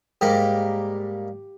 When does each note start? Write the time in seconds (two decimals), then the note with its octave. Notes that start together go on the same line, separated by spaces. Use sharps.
0.21 G#2 G3 A#3 G4